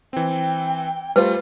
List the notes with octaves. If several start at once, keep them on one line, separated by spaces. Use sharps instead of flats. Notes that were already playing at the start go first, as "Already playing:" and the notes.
E3 C4 G5
G3 A3 F4 B4 C5